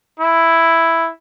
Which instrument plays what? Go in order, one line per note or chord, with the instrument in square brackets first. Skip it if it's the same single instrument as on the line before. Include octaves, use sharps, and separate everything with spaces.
[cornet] E4